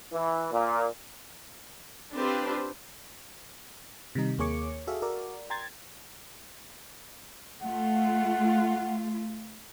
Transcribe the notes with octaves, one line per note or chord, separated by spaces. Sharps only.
E3
A#2
C4 D4 F4 G4 B4 C5
C3 D#3 G3 D#4
D#2 A#3 G#4 C#5 D6 C#7
F#4 G#4 A4 E5 F5
F#4 A#4 D5
G5 A#5 C6 G#6 A6
A3 F4 F#5